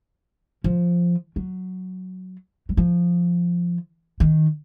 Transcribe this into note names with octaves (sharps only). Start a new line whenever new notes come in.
F3
F#3
F#3
F3
D#3